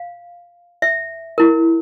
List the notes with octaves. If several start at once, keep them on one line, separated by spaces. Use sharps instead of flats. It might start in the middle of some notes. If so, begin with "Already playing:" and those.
Already playing: F5
E5
E4 A#4